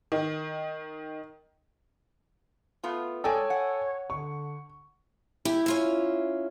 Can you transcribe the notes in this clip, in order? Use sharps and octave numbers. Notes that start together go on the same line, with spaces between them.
D#3
A3 B3 F4
G#3 A4 C#5 D5 G5 G#5
F#5
D3 C#6
E4 G4
C#4 F4 E5